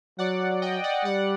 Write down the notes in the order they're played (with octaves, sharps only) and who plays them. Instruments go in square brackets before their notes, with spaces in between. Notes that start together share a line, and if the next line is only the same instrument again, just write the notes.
[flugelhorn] F#3 [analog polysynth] D5 F#5
[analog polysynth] D#5 G5
D5 F#5
[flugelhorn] G3 [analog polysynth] D5 F#5